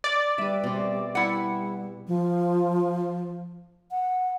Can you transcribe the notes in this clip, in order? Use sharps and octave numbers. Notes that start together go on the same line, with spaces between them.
D5
G3 B4 E5
B2 C4
G3 E4 F#5
F3
F#5